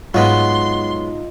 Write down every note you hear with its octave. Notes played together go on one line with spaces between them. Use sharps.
G#2 F#3 G#3 B3 F4 D#5 C6